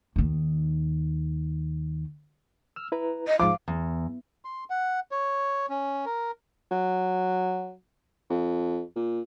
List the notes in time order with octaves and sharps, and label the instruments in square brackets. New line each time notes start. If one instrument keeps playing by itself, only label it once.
[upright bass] D#2 D#3
[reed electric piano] E6 F6
E4 B4 A#5
[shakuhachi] D#5
[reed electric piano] G#2 F3 [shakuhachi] F5 [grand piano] D6
[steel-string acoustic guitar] E2
[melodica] C6
F#5
C#5
C#4
A#4
[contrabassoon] F#3
F2
A#2